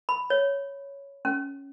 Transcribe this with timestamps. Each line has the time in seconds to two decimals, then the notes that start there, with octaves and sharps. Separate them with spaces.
0.09 B5
0.30 C#5
1.25 C#4